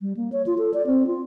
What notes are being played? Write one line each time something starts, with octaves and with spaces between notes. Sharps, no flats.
G3
A#3
C#5
F4
A4
D5
C4
F4